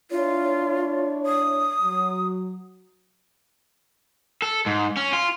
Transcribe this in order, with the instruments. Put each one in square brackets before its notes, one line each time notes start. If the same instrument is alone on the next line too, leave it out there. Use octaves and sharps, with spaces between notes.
[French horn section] D4 E4 C#5 [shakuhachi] F4
[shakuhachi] D#6
[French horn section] F#3
[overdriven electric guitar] A4
G#2
C#4
F4